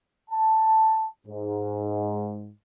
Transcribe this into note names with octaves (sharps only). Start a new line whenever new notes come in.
A5
G#2